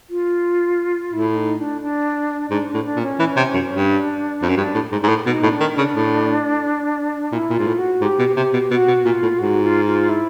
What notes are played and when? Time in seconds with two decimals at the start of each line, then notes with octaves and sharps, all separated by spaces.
0.10 F4
1.13 A2 E4
1.35 D#4
1.59 D4
1.81 D4
2.50 G#2 D4
2.68 D4
2.74 A2
2.85 D4
2.96 A#2
3.02 C#4
3.19 E3
3.37 C3
3.54 F#2
3.71 G2
3.89 D4
4.42 F2
4.49 F#2
4.57 G2 D4
4.75 A2
4.92 G#2
5.03 G#2
5.09 A2
5.26 B2 D#4
5.43 A2
5.49 D4
5.60 D#3
5.73 D4
5.78 C#3
5.95 A2
7.32 A#2 E4
7.50 A#2
7.56 G#2 F4
7.67 A2
7.78 F#4
8.01 G#2 G4
8.19 B2
8.36 C3 G4
8.53 B2
8.70 B2 F#4
8.88 B2
9.05 A#2 F4
9.22 A2
9.39 G#2 F#4
9.63 F4
9.85 F4
10.09 E4